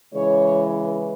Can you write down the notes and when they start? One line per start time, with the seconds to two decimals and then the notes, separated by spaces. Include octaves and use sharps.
0.13 C#3 E3 G#3 C#5
0.85 B4